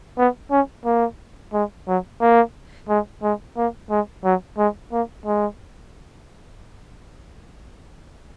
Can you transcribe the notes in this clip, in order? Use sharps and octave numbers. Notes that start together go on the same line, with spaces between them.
B3
C#4
A#3
G#3
F#3
A#3
G#3
G#3
A#3
G#3
F#3
G#3
A#3
G#3